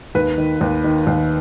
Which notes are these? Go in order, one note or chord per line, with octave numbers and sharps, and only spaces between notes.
D#2 B4
D#3
D#2
D#3
D#2